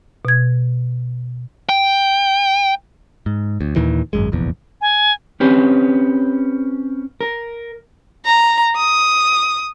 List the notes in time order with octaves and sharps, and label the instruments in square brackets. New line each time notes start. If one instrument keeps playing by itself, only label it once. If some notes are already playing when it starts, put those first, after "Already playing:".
[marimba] B2 G#6
[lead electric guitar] G5
[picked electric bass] G#2
D2
D#2 A#2 D#3 E3
G#1 F#2 G#3
F1 A#1 E2
[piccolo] G#5
[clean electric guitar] C4 C#4 G4 B4
A#4
[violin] A#5
D#6